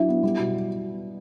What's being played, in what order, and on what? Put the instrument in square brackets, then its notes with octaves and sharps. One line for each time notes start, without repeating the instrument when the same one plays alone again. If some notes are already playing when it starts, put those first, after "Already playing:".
Already playing: [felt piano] F#3 D4 [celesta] E4 E5
[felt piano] B3
G3
B2